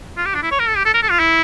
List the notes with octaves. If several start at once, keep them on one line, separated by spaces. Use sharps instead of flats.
F4
G4
D4
E4
C#5
A#4
A4
G4
A4
A#4
A4
F4
E4